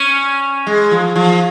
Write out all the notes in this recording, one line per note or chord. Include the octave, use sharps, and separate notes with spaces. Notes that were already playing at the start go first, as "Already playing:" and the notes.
Already playing: C#4
G#3
F3
F3